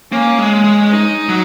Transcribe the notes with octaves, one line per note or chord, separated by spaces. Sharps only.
A#3 C#4
G#3
G#3
D#4
F#3